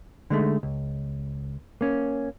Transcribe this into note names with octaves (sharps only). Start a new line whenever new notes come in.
D3 G#3 A3 D#4
C#2
A#3 C#4